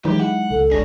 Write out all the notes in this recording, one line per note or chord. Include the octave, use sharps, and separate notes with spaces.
D#3 E3 F#3 G#3 D#4 E4 G4
G#3 E4 F#5
C#2 A4
G1 C#2 D4 G#4 C#5 A#6